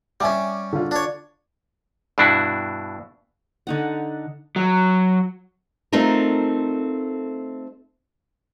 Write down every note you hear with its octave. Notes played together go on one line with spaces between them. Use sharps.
G3 C#4 E5 G#5 D6
D3 F4
D4 C#5
G2 B2 D4 E4 F#4
D3 D#4 F#5
F#3
A3 C4 D#4 F4 A4 A#4